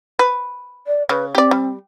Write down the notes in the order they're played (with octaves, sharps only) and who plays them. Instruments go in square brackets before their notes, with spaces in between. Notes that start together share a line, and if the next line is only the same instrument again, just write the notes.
[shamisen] B4
[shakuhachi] D5
[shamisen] C#3 [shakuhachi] B4
[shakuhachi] C4 [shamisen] G4 D5
[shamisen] G3